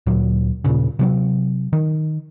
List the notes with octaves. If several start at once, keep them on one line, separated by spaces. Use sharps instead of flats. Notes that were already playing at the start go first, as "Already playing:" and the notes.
D2 A#2 F#3
D#1 G#1 A#2 C#3
C3 F#3 C4
D#3